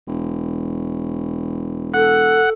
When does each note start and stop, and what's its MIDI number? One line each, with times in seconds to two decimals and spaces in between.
0.07 2.50 28
1.94 2.51 69
1.94 2.50 78